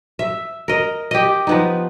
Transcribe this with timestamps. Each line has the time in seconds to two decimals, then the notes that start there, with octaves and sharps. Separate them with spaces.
0.19 E5
0.68 A#4 D#5
1.11 G4 D#5
1.47 F3 B3 D#4